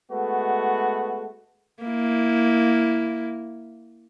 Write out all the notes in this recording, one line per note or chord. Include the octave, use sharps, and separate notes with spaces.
G#3 A3 B3 F#4
A#3 E4